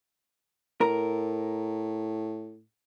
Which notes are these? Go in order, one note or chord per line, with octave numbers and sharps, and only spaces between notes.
A2 A#4